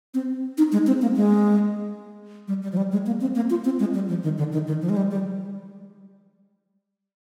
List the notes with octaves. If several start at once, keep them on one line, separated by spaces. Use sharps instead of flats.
C4
D#4
G#3
C4
A#3
G#3
G3
G3
F3
G3
G#3
A#3
C4
A#3
F4
C4
G#3
G3
F3
D#3
D3
D#3
D#3
F3
G#3
G3
G3